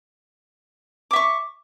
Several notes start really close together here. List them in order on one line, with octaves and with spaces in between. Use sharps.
D6 E5 C#6